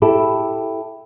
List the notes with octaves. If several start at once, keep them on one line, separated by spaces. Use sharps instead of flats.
E4 G4 A4